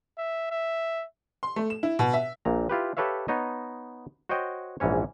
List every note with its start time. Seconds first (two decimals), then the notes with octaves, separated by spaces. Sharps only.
0.18 E5
0.51 E5
1.43 C6
1.56 A3
1.70 E7
1.83 E4
1.99 B2
2.14 E5
2.45 A#1 A#2 A#5
2.69 E4 F4 G4 B4
2.97 G4 A4 B4 C#5 E5 F5
3.28 B3 D#4 C#5 D#5
4.29 F#4 C5 C#5 D#5 G5
4.80 A#1 G#2 E3 C#4 C#5